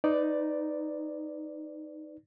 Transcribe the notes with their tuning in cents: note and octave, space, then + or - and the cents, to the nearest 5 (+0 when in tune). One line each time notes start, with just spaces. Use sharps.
D#4 +0 B4 +25 D5 +0